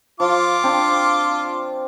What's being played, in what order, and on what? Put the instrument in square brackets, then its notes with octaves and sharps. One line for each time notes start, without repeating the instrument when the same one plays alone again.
[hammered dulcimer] F3 [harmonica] F4 D6
[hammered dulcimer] C4 D4